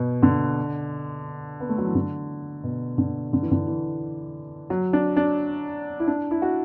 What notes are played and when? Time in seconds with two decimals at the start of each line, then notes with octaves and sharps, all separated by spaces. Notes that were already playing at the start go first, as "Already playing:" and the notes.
Already playing: B2
0.23 D3
1.60 B3
1.69 A3
1.78 F#3
1.87 E3
1.95 D3
2.64 B2
2.98 D3
3.33 D3
3.42 E3
3.51 D3
3.67 E3
4.70 F#3
4.93 D4
5.16 D4
6.00 E4
6.08 D4
6.31 E4
6.42 F#4